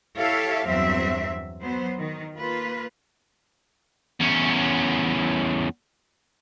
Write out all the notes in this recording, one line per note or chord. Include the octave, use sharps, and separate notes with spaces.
E4 G4 A4 C#5 E5 F5
E2 G2 F#3 C4 E5
F#3 B3 C5
D#3
A#3 F4 B4
E2 C#4